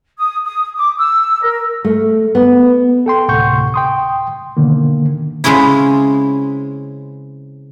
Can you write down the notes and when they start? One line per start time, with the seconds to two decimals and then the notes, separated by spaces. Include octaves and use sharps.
0.18 D#6
0.44 D#6
0.76 D6
0.97 E6
1.41 A#4
1.84 A3
2.35 B3
3.06 A4 G5 C6
3.28 D2 A2 C3 F#5 C#6 G6
3.74 G5 C6 D#6
4.57 B2 D3 D#3 A#3
5.44 C#3 G#3 C4 C#4 E4